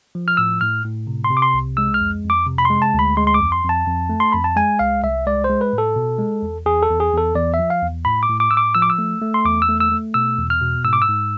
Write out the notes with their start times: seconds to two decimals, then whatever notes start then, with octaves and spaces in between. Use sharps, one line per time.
0.15 F3
0.28 F6
0.37 A2 E6
0.61 A2 F6
0.85 A2
1.07 C3
1.24 C6
1.30 C3
1.37 D6
1.42 C6
1.54 C2
1.77 G#3 E6
1.94 F6
2.00 F2
2.24 F2
2.30 D6
2.47 C3
2.58 B5
2.65 G#3 C6
2.82 A5
2.94 D2 B5
3.17 G#3 C6
3.27 C6
3.34 D6
3.40 F2
3.52 C6
3.64 F2
3.69 A5
3.87 F2
4.10 A3
4.20 C6
4.32 F2 B5
4.44 A5
4.56 G#3 G#5
4.79 C2 F5
5.04 C2 E5
5.27 G#3 D5
5.44 C5
5.50 G#3
5.61 B4
5.73 A2
5.78 A4
5.96 B2
6.19 G#3
6.43 E2
6.66 E2 G#4
6.83 A4
6.89 E2
7.00 G#4
7.13 E2 A4
7.35 E2 D5
7.54 E5
7.59 F3
7.70 F5
7.82 E2
8.05 A2 B5
8.23 D6
8.29 A2
8.40 D6
8.51 A2 E6
8.57 D6
8.75 F3 E6
8.82 D6
8.90 E6
8.99 A3
9.22 A3
9.34 C6
9.45 E2 D6
9.62 E6
9.69 A3
9.80 E6
9.91 A3
10.14 B2 E6
10.38 E2
10.50 F6
10.61 B2
10.84 G#2 E6
10.93 D6
11.02 E6
11.08 G#2